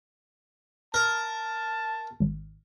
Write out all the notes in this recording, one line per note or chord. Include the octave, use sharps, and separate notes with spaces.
A#4 A5
G#1